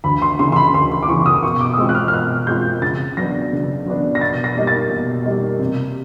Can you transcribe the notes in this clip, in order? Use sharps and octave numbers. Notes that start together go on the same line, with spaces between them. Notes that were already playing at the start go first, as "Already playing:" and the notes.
D2 B5
C6
C#3 E3 C6
C6
B5
D2 C6
C6
D6
C#3 E3 C#6
D#6
B2 C#6
D6
D#6
G#3 C4 F4 E6
F#6
F6
F6
B2 F#6
G#3 C4 F4 G6
C#3 A6
F#3 B3 D4 A#6
C#3
F#3 B3 D4
A#6
B2 A6
A#6
G3 A#3 D#4
A6
B2
G3 A#3 D#4
C3